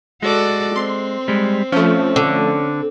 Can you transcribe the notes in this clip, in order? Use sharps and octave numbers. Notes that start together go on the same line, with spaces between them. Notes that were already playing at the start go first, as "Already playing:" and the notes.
G#3 F#4 A4 D5
C4 C6
G3 G#3
F3 A3 C#4
D3